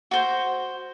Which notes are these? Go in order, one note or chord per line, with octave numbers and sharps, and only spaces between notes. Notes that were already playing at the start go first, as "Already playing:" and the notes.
F#4 C5